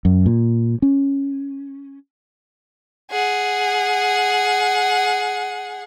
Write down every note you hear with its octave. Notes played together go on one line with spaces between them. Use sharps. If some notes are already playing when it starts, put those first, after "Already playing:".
F#2
A#2
C#4
G#4 F#5